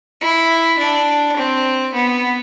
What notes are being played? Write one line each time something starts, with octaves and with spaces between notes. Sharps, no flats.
E4
D4
C4
B3